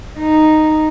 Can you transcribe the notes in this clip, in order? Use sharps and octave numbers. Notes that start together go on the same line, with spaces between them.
D#4